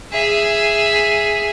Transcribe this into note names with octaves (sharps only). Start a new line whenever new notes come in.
G#4 E5